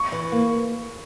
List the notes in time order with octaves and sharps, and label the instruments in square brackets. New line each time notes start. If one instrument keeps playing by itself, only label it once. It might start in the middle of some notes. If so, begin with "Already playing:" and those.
Already playing: [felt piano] C#6
[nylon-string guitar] E3
A#3